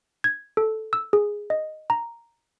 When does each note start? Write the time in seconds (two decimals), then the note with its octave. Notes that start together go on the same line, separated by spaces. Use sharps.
0.24 G#6
0.57 A4
0.93 E6
1.13 G#4
1.50 D#5
1.90 A#5